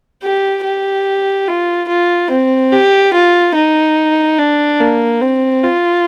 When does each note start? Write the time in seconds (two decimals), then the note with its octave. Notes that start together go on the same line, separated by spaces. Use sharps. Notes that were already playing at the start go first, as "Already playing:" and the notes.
0.23 G4
0.64 G4
1.47 F4
1.89 F4
2.30 C4
2.72 G4
3.13 F4
3.55 D#4
4.39 D4
4.80 A#3
5.21 C4
5.63 F4